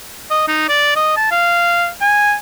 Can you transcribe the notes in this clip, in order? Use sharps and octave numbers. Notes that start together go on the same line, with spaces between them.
D#5
D#4
D5
D#5
A5
F5
G#5